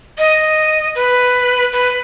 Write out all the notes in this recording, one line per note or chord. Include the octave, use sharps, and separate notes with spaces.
D#5
B4
B4